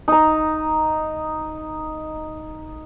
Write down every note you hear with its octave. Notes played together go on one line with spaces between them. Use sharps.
D#4 A#5